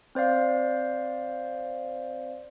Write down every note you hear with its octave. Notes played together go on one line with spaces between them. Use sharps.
C4 C5 D5 F5